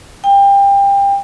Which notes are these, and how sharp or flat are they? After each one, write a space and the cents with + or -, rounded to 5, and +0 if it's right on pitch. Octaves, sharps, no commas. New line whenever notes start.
G5 +25